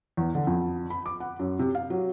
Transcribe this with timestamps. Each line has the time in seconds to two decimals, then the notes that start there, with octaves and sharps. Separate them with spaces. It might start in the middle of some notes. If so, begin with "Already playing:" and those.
0.17 E2
0.35 D3
0.47 F2
0.90 B5
1.06 D6
1.20 F#5
1.39 F#2
1.59 C3
1.75 F5
1.90 F#3